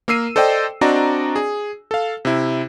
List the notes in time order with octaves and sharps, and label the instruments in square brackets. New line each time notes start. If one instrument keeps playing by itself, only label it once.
[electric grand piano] A#3 A#4 E6 C7 D#7
A4 C5 D5 D#5 G5
C4 D4 F#4 D5 D#5 A#5
G#4
A4 F5
C3 E4